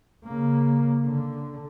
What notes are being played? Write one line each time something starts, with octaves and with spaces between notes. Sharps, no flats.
C#3 A#3
D3